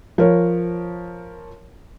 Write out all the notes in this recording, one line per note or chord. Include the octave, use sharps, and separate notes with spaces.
F3 A#4 C#5